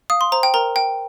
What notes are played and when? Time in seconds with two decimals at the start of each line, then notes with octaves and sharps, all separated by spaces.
0.10 F5 D#6
0.21 C6
0.32 C5 A#5
0.43 G5
0.54 A#4 A#5
0.76 G5